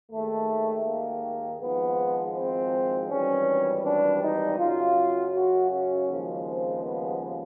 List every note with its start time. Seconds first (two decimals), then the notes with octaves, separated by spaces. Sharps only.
0.12 D#2 D#3 G#3 A3
0.86 A#3
1.61 G#1 G#2 F3 G#3 B3
2.36 C4
3.10 G#1 G2 E3 G3 C#4
3.85 D4
4.23 D#4
4.59 F#2 C#3 F#3 F4
5.34 F#4
5.71 C#4
6.08 D#2 C#3 F3 G#3
6.46 C4
6.83 B3